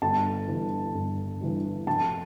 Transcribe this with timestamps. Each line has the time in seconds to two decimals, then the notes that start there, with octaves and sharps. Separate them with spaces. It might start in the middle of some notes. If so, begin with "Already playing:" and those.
0.02 G1 A5
0.48 G2 E3
0.95 G1
1.41 G2 E3
1.87 F1 A5